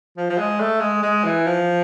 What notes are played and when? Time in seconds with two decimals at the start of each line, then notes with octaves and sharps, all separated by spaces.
0.17 F3
0.30 F3
0.38 G#3
0.60 A3
0.81 G#3
1.03 G#3
1.24 E3
1.47 F3